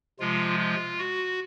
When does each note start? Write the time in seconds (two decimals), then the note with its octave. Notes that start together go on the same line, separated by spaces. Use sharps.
0.20 C3 F3 G#3 F4
0.59 F4
0.99 F#4